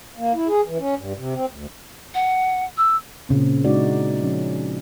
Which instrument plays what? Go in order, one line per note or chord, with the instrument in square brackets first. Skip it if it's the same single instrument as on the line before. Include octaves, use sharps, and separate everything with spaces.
[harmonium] A#3
E4
G#4
E3
C#4
G2
C3
C4
D2
[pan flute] F#5
E6
[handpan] A#2 C#3 C4
G#3 D4 D#4 F#4 D5
F3 C#4